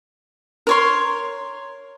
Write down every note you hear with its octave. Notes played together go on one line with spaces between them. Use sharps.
A#4 C#5 C6